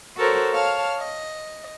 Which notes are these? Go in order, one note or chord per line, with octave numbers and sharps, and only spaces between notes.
F#4 A4 A#4 C5 C#5
C#5 F5 A5 F6
D#5